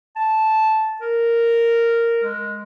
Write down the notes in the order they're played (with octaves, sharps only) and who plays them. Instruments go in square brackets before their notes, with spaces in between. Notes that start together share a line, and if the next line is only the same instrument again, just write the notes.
[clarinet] A5
A#4
G#3